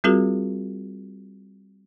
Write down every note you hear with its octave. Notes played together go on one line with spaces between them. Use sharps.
G3 C4 F4 F#4 G#4 A#4